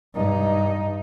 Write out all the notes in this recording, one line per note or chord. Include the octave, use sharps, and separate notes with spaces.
G2 D#4